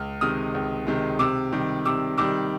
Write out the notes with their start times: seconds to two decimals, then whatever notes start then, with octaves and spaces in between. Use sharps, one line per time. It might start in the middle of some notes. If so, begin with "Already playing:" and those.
Already playing: C#2 F6
0.21 C3 D#3 G#3 D#6 F6
0.55 C#2
0.87 C3 D#3 G#3
1.19 C3 D6 E6
1.52 D#3 G3
1.85 C3 D6 E6
2.18 D#3 G3 D6 E6